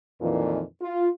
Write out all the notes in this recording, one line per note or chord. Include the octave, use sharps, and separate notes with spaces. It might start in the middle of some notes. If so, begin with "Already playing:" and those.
F2 A#2 D#3 E3
F4